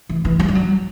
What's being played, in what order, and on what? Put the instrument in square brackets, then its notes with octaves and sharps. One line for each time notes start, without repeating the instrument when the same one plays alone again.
[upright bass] E3
E3
F#3
G3
F#3